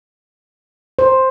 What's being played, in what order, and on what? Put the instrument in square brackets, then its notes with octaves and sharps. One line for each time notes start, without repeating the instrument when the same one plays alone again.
[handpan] C5